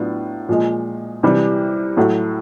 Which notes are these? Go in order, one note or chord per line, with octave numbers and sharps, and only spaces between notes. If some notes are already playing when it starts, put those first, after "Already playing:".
Already playing: A2 F#3 B3 D4 F4
A#2 F3 G#3
C3 E3 G3
A2 F#3 A3